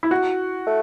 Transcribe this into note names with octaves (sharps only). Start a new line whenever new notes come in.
E4
F#4
A3